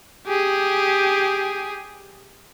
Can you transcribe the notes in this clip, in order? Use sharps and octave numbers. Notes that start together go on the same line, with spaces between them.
G4 G#4